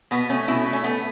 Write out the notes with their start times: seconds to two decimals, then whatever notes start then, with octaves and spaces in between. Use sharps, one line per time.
0.11 B2 B3
0.30 A3 C#4
0.48 B2 E4
0.66 A3
0.73 C#4
0.84 A3 B3